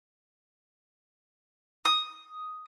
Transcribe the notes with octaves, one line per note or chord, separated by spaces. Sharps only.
D#6